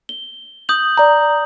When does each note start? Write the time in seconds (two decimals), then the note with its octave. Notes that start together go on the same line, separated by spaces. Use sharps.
0.09 G7
0.69 D#6 G6 F#7
0.98 D5 A#5